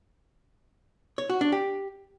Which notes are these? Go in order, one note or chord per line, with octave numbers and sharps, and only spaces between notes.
C#5
F#4
D4
G4